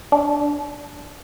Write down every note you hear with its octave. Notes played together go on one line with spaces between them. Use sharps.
D4